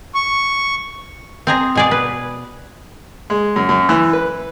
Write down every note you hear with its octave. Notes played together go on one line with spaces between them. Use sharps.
C#6
C4 G#4 A#5
B2 G#4 D5
B4
G#3
F#2
F#2
E3
B4